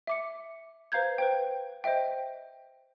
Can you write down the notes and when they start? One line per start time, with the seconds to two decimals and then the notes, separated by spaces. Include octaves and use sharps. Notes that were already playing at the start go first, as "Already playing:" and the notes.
0.07 E5 D6 C#7
0.92 B4 C5 F5 A#5 G6 G#6
1.18 B4 C5 G5
1.84 C5 D#5 E5 G5